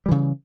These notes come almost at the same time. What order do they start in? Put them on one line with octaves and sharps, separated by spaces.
G3 E3 C#3